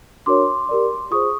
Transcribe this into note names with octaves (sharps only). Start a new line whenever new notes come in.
D4 F#4 A#4 C#5 C6 D6
G4 A#4 D5
F4 G#4 C5 C#6 D#6